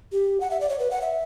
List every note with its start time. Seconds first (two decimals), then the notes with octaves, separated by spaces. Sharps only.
0.12 G4
0.40 F#5
0.51 E5
0.60 D5
0.69 C#5
0.79 B4
0.91 F#5
1.01 E5